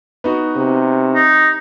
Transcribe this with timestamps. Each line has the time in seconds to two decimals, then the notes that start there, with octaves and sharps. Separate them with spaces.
0.24 B3 D#4 F#4
0.56 C3
1.15 D#4